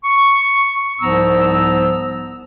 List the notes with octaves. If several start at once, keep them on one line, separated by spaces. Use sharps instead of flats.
C#6
C2 G#2 F3 B3 A#5 E6